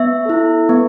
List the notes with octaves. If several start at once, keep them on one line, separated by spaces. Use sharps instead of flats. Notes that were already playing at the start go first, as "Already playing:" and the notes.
Already playing: B3 E5
E4 A4
B3